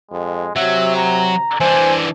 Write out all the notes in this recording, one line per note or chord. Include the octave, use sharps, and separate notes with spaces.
F2 G#3
C3 F#3 E5
A#5
E3 D4 C5 G#5